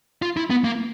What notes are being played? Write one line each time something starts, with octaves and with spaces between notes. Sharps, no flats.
F4
E4
B3
A#3